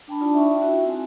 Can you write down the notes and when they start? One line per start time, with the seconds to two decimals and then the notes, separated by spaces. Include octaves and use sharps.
0.08 D4 G5 A5 B5
0.20 D4 D#4 F4 D5 G5 A5
0.34 E5 G5 C#6
0.47 E5
0.62 E4 F#4 E5
0.86 C4 F#4 G#5